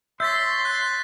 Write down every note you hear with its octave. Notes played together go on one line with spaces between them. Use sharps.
C#5 E5 C6 G6 A6 B6
F#6 A6